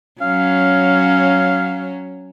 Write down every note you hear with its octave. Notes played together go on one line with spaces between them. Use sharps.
F#3 C#4 F5